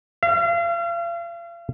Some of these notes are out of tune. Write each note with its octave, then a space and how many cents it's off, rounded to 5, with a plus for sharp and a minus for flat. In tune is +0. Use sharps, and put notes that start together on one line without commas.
F5 -40